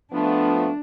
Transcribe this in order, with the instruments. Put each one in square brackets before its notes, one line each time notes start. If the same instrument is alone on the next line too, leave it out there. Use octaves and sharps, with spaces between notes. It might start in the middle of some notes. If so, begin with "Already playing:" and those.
[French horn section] F3 A3 B3 [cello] D4